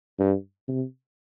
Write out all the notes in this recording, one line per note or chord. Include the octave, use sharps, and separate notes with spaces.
G2
C3